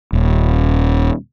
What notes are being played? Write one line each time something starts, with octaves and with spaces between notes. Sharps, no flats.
D#1